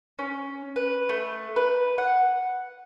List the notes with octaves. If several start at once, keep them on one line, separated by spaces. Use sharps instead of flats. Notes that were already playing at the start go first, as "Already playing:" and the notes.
C#4
B4
A3
B4
F#5